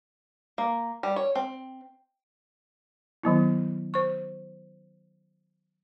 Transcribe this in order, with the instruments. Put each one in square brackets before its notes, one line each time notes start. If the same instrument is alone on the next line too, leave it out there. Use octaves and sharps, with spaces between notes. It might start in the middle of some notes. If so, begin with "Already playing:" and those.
[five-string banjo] A#3
G3
C#5
C4
[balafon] D#3 F#3 B3 E4
C5 C#6